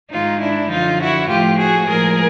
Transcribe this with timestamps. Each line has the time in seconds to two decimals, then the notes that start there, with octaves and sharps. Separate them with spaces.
0.11 G#2 D#3 G#3 D#4 F4
0.41 D4 E4
0.70 F#2 D3 F3 D#4 F4
1.01 E4 F#4
1.29 A2 F3 A3 F4 G4
1.59 F#4 G#4
1.88 A2 F3 G#3 G#4 A#4